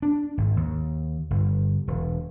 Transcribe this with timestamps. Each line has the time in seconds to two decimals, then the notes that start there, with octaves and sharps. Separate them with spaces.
0.02 D4
0.38 G#1
0.57 D#2
1.30 G1
1.87 E1